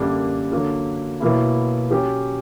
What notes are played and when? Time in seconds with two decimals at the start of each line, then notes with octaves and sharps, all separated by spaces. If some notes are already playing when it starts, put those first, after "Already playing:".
Already playing: F#2 D3 G3 A#3 D4
0.51 D3 F#3 A#3
1.20 B2 F#3 A#3 E4
1.91 F#3 C#4 G4